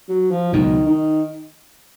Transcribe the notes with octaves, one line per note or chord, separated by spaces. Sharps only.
F#3
F3
C#2 B2 D#3 F#3
D#3